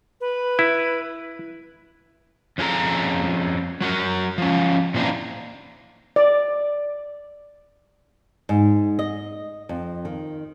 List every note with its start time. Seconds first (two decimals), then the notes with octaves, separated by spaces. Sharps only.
0.21 B4
0.59 E4
2.58 F2 C#4 G#4 A4 A#5
3.81 F#3 F#4 A#4
4.38 F3 C#4
4.94 A#2 E3 C4 D4 D#4
6.16 D5
8.49 G#2
8.99 D#5
9.69 F2
10.05 D#3